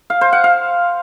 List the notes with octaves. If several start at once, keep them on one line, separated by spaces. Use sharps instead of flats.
F5
C5
F#5
F5